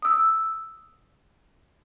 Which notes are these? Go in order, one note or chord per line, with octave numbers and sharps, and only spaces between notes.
D#6 E6